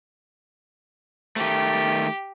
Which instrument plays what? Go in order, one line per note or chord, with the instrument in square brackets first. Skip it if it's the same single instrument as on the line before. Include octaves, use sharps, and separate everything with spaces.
[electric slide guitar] D#3 A3 [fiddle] G4